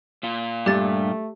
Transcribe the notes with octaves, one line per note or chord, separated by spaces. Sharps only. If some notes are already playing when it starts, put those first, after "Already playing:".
A#2 F4
G2 A3 G4 A6